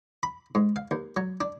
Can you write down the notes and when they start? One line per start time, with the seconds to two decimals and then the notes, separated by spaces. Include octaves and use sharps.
0.23 B5
0.55 G#2
0.76 F5
0.91 D#2
1.17 F#3
1.41 D4